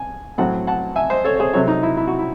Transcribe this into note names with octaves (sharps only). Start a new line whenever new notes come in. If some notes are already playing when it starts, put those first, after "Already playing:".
Already playing: G#5
A2 F#3 C4 F#5 A5
F#5 A5
E5 G#5
C5 D#5
A4 C#5
C#5
G#4 C5
C3 F#3 C4 A4 C#5
D#4
E4
E4
F#4
E4